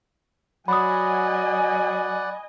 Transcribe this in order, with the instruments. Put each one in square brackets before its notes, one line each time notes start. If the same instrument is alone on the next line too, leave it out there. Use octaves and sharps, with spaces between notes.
[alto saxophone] F#3 [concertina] D5 F#5 [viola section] D#5 G#5 [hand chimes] B5 D#6